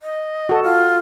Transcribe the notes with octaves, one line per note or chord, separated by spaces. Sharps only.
D#5
F#4 A4
F4